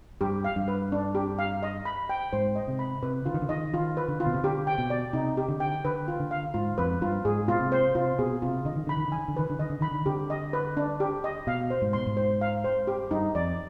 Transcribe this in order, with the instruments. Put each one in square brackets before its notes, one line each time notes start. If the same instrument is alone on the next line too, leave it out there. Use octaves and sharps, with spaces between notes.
[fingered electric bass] G2 [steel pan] G4
[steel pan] F5
[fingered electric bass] G2
[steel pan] B4
D4
G4
F5
D#5
B5
G5
[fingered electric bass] G#2 [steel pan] C5
[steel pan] D#5
[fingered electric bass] C3
[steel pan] B5
[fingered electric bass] C3 [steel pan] B4
[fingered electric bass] D3 [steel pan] F4
[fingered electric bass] D#3
D3
[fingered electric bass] D#3 [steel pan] D#5
[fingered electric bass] D#3 [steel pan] F4
[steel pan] B4
[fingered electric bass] D3
[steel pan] F4
[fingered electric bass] B2
C3
[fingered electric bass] D3 [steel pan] G4
[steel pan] G5
[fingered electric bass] B2
[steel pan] D5
[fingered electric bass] C3 [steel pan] D#4
[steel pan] G4
[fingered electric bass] D3
[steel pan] G5
[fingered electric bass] D3 [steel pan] B4
[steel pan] F4
[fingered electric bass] D3
[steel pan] F5
[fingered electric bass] G#2 [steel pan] F4
[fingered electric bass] F2 [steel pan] B4
[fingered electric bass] G2 [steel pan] F4
[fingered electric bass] G#2 [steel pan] G#4
[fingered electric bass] B2 [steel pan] F4
[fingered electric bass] C3
[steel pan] C5
[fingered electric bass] C3 [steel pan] F4
[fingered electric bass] B2 [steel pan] G#4
[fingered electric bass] C3 [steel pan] F4
[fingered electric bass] D3 [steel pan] D#5
[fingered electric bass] D#3
[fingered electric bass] D3 [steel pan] B5
[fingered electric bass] D#3
[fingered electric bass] D3 [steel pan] G#5
[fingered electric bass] D#3
D3
[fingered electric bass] D#3 [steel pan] B4
[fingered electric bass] D3
[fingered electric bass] D#3 [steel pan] D#5
[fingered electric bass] D3
[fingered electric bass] D#3 [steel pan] B5
[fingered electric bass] D3
[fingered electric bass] D3 [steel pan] G4
[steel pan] D#5
B4
D4
G4
D#5
[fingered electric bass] B2 [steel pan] F5
[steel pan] C5
[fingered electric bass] G#2
[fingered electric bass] B2 [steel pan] C6
[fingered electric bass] G#2
[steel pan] C5
F5
C5
G4
[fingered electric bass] G2 [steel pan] D#4
[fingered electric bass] F2 [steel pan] D5